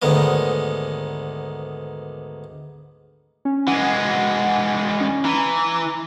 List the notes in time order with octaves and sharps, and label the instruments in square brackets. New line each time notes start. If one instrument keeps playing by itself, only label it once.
[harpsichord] D2 G#2 D3 D#3 B3 D#5
[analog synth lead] C#4
[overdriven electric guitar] E3 G#3 [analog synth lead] F#5
[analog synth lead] C#4
[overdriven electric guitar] E3 [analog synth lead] A#5